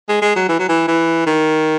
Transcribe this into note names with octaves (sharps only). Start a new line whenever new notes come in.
G#3
G#3
F#3
E3
F#3
E3
E3
D#3